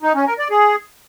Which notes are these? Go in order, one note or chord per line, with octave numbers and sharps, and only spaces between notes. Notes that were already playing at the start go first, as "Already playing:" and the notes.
D#4
C#4
A#4
D5
G#4